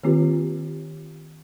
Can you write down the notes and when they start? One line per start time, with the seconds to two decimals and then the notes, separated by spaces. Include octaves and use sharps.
0.04 D#3 A#3 C4 F4 G4 B4